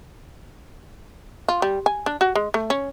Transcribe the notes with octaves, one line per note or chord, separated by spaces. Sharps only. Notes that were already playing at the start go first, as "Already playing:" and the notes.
F4
G3
G#5
D4
F#4
G#3
A3
C#4